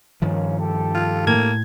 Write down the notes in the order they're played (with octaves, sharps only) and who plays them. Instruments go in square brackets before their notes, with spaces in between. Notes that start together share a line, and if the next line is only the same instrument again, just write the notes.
[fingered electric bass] G2 D#3 F3 [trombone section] A#3 C#4
[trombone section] G4 A4
[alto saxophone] F4
[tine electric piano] A2 G#6 [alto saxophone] A#3